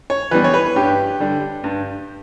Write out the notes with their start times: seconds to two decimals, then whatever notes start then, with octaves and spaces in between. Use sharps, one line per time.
0.10 C#5
0.31 E3 G3 B3 D4 B4
0.44 C#5
0.54 B4
0.76 G2 G4
1.20 D3 G3 D4
1.64 G2